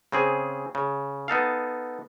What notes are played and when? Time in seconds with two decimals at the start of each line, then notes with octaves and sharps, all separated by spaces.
0.12 C#3 C4 G#4
0.75 C#3
1.28 B3 D#4 A4 F5